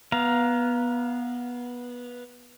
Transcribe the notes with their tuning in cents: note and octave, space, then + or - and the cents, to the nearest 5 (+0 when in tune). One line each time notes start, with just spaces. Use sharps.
B3 -15 F5 +0 A#5 +15